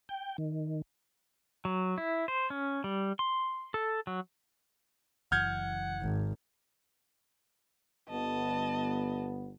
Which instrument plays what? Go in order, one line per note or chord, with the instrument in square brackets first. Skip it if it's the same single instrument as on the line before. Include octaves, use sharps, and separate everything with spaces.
[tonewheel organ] G5
D#3
[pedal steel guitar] F#3
E4
C5
C#4
G3
C6
A4
F#3
[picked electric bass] F#1 F#2 E3 [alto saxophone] F#5 [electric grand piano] F6 G6 G#6
[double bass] G#1
[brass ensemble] G1 B3 [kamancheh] D#5 A5